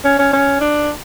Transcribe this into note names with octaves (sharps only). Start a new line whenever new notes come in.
C#4
C#4
C#4
D4